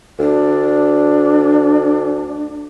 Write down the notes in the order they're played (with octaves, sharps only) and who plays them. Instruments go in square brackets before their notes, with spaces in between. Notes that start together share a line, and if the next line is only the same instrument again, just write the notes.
[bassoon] D2 [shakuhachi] D4